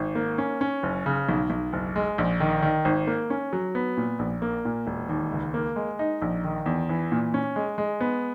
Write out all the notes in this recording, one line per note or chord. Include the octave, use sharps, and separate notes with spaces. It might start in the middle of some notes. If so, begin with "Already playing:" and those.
Already playing: G#1
A#3
C#4
C#4
F#1
C#3
B1
B1
F#1
G#3
A#1
D#3
D#3
G#1
A#3
C#4
F#3
B3
A#2
A#1
A#3
A#2
E1
D#2
C#2
A#3
G#3
D#4
A#1
D#3
E2
E3
A#2
C#4
G#3
G#3
B3